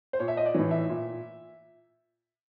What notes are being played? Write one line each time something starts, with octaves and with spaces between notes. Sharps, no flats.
C5
A#2 C#5
E5
D#5
D5
A2 E3 C#5
E5
A#2